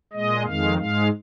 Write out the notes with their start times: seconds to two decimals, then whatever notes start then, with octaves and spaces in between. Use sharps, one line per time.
0.13 A#2 G#3 D#5
0.45 F2 D#3 G#3 F5
0.78 G#2 G#3 F5